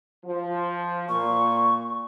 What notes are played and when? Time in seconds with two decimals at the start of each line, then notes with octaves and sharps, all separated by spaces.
0.24 F3
1.09 A#2 C#6